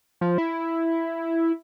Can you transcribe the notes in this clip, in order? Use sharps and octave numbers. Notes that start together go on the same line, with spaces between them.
F3
E4